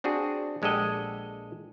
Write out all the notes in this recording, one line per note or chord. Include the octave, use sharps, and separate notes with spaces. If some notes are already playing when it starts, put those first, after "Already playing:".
C4 D4 F#4 G#4
A#1 G#3 G4 A4 D#5 F#5